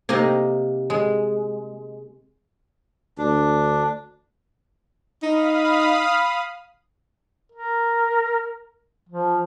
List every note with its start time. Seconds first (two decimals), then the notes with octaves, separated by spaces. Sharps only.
0.09 C3 A#3 D#4 D#5
0.90 G#3
3.18 D2 D4
5.23 D#4 F5 B5 D#6
7.52 A#4
9.09 F3